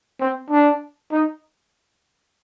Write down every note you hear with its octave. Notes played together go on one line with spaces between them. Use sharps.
C4
D4
D#4